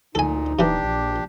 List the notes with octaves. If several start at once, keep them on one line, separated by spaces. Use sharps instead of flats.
D2 A#2 D#4 A4 G#5
D#1 C3 E3 D4 G4
A#1